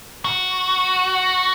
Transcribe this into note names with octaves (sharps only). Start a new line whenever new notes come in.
F#4